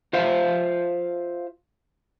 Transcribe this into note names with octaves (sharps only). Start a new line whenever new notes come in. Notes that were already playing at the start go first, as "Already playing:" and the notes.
F4 C5 E5 F5